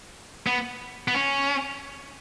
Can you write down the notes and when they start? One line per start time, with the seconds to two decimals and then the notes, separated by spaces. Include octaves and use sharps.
0.47 B3
1.08 B3
1.15 C#4